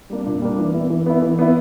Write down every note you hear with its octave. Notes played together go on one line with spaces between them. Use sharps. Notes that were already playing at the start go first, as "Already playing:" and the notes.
G3 A#3 D4
A#2
G3 A#3 D4
E3
B3 E4
E3
B3 E4
E3
B3 E4